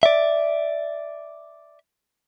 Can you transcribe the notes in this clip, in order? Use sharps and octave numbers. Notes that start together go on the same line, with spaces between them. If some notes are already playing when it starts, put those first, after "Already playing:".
D5 E5